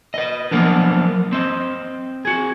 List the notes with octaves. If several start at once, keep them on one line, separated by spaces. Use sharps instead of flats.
B4 D#5
F3 F#3 A#3 B3 D4
C4 D#5
F#4 G#4